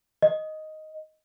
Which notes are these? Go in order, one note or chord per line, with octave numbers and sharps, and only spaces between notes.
D#5